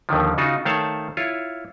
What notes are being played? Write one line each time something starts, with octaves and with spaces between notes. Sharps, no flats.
D#2 D3 D#3 F3
C#3 D#4 F4 F#4
D#3 A3 C5 C#5 F5 A5
E4 F4 C#5